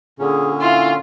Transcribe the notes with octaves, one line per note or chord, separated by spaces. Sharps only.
A#2 D3 C#4 G#4
E4 F4 C6